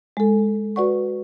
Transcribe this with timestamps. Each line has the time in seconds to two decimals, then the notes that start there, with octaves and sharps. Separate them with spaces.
0.17 G#3 A4
0.76 F#4 B4 D5 F#5 C#6